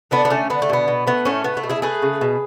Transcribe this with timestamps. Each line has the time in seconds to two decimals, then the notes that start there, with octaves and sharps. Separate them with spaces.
0.11 D3 B3 D4
0.25 B3
0.30 D3 A3 C#4
0.50 D3 B3
0.62 A3
0.70 B2 B3
0.88 B2
1.07 A3 B3
1.25 A2 A3 C#4
1.44 A3 B3
1.57 A3
1.63 B2
1.70 E4 G#4
1.82 A3 G#4 B4
2.02 C#3
2.21 B2